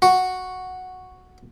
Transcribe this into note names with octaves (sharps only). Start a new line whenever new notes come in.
F#4